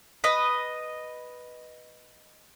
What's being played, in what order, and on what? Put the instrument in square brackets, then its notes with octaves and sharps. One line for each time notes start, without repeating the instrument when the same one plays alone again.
[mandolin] B4 D#5